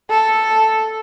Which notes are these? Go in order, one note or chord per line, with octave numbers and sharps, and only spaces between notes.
A4